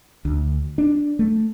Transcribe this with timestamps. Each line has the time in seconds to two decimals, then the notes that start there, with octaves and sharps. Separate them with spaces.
0.25 D2
0.78 D4
1.19 A3